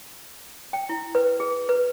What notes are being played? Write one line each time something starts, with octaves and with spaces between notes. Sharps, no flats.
G5
E4
B4
G#4
B4